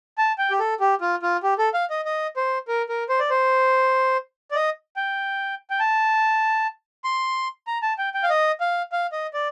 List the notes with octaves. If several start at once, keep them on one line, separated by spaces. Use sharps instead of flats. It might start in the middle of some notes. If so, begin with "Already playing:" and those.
A5
G5
G4
A4
G4
F4
F4
G4
A4
F5
D#5
D#5
C5
A#4
A#4
C5
D5
C5
D5
D#5
G5
G5
A5
C6
A#5
A5
G5
G5
F5
D#5
F5
F5
D#5
D5